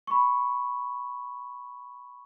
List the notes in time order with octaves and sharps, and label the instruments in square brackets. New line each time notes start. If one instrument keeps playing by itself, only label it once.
[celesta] B5 C#6